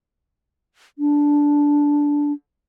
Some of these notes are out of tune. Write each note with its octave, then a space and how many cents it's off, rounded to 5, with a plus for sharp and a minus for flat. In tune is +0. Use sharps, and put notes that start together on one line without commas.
D4 -10